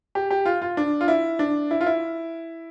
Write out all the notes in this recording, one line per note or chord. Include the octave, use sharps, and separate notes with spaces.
G4
G4
F4
F4
D4
F4
E4
D4
E4
F4
E4